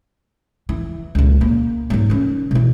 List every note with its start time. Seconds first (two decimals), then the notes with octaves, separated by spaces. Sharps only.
0.69 E3
1.15 C#2 A#2
1.41 A#3
1.90 G#2 F#3
2.10 D#3 C#4
2.51 B2 E3